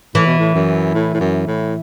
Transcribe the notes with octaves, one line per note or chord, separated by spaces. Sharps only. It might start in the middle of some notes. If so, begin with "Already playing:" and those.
A2 E3
B2
A2
F#2
A2
A2
F#2
A2